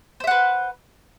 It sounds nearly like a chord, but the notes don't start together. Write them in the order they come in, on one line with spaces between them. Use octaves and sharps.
C5 E5 F#5 B4